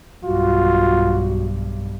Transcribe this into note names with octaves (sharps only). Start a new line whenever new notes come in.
B1 G2 F4 F#4